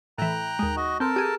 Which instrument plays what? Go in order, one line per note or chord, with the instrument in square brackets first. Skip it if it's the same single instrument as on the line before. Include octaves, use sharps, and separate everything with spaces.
[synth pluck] A2 E3 [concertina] G5 A#5 F#6
[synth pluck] D#2 G#3
[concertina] F#4 D#5
[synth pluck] C4 [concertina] A4 A#4 A5
[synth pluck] G4 G#4